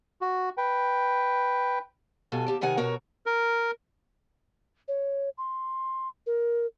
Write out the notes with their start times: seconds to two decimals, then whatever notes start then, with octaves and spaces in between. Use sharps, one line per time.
0.21 F#4
0.57 B4 G5
2.32 G2 B2 F#4 A4 G#5
2.47 D#2 G4 A5
2.61 C3 D#3 A#4 F#5 G#5
2.77 B2 F#4 A#4 C#5
3.26 A#4
4.88 C#5
5.38 C6
6.27 A#4